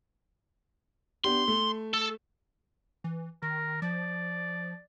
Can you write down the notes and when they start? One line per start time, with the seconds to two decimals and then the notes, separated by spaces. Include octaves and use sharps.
1.24 B3 D4 G4 C6
1.48 A3
1.94 A4
3.04 E3
3.42 D#3 A#4
3.82 F3 D5